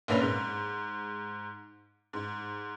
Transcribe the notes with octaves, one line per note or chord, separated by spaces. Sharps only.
F1 A#1 A#3 C#4 B4 F7
G#2
G#2